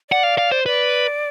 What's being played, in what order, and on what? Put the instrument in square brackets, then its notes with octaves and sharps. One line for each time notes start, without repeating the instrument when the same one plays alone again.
[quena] D5 [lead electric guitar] F#5
[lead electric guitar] F5
F5
C5
[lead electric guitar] B4 [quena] D5